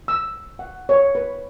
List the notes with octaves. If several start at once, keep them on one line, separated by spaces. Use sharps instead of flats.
E6
F#5
C#5
B4